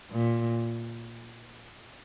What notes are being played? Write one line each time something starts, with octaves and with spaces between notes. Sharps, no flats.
A#2